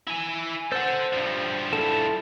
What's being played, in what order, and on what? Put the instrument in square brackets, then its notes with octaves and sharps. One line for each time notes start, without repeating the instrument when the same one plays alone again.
[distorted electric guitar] E4 G#5
[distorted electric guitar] A4 F#5 [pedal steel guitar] C5 E6
[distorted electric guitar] G2 F3
[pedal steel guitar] E4 A4 A5